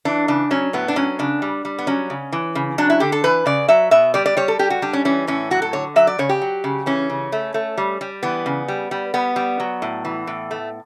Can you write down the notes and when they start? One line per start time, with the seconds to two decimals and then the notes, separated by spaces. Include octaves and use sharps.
0.05 E3 D4
0.28 C#3 D4
0.51 F#3 C#4
0.73 A2 B3
0.88 D4
0.96 F#3 C#4
1.19 C#3 D4
1.42 G3
1.65 G3
1.78 B3
1.87 F#3 C#4
2.10 C#3
2.33 E3
2.55 C#3
2.78 F#3 D4
2.90 E4
3.00 D3 G4
3.12 A4
3.24 E3 B4
3.46 C#3 D5
3.68 F#3 E5
3.91 B2 E5
4.14 G3 D5
4.26 D5
4.37 G3 C#5
4.48 A4
4.59 G3 G4
4.70 F#4
4.82 G3 D4
4.93 C#4
5.05 E3 C#4
5.27 A2 C#4
5.51 F#3 F#4
5.62 A4
5.73 D3 C#5
5.96 F#3 E5
6.07 D5
6.19 C#3 C#5
6.29 G4
6.42 F#3
6.64 C#3
6.86 E3 C#4
7.10 C#3
7.32 A3
7.54 A3
7.78 G3
8.01 G3
8.23 E3 B3
8.46 C#3
8.68 G3
8.91 G3
9.14 G3 B3
9.36 G3
9.60 F#3
9.82 A2
10.05 E3
10.27 A2
10.51 A3